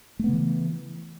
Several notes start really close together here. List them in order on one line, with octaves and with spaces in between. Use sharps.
A3 B3 C#3 E3